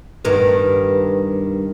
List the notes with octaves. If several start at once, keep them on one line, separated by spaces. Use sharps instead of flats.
G2 D#3 B3